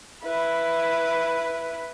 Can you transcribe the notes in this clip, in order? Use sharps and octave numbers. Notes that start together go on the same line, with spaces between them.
E4 B4